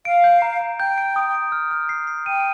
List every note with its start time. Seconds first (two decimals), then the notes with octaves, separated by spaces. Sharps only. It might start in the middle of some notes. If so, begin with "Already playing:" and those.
0.05 F5 D7
0.24 G6
0.42 A#5
0.61 A#5
0.80 G5 G6
0.98 D7
1.16 D#6
1.35 D7
1.52 F6
1.71 F6
1.89 C7
2.07 C7
2.26 G5 D#7